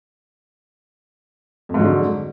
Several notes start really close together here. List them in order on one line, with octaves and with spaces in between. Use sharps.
F2 G#2 F#3 D3